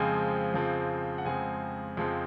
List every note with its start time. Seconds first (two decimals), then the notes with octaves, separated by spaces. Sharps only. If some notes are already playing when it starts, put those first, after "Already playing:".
Already playing: F2 C#3 F3 G#3 C4 G#5
0.54 F2 C#3 F3 G#3 C4
1.18 F#5
1.25 F2 C#3 F3 G#3 C4 G#5
1.97 F2 C#3 F3 G#3 C4